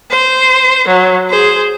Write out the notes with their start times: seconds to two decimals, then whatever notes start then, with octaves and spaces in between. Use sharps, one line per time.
0.10 C5
0.88 F#3
1.30 G#4 C5